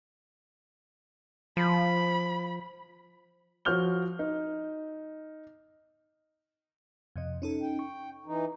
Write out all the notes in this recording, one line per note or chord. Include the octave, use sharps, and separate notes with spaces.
F3 B5
F3 F#4 C#5 F6 G6 G7
D#4
F2 C3 D#5
C#4 D#4 A4
G5
C#6
E3 D#4